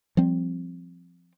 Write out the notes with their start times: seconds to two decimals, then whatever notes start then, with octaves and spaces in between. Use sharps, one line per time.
0.17 F3 G3 C4